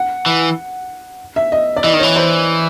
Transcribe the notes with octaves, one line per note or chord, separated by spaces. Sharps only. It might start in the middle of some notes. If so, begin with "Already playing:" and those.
Already playing: F#5
E3
E5
D#5
D5
E3 D#5
D#3
E3 C#5
C5